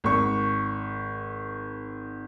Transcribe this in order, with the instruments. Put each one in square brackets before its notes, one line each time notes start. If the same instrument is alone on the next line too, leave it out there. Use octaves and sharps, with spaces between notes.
[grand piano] G#1 C#6